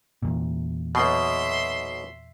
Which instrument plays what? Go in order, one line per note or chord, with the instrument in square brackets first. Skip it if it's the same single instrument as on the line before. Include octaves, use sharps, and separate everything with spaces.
[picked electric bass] E2 A#2
[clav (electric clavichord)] B1 B2 [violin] E5 C6